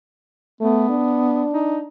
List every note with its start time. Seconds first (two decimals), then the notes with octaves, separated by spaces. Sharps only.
0.61 A3 B3
0.90 D4
1.54 D#4